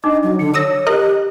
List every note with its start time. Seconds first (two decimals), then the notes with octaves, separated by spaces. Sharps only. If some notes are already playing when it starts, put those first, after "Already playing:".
0.04 D4 D#4 D#5 D6
0.23 F#3
0.39 D3 C#7
0.54 C#5 D#6 E6 A#6
0.87 G4 A#4 D#5 F#6